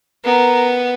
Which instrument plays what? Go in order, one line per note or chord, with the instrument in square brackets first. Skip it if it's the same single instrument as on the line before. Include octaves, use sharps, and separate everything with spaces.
[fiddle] B3 [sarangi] A#4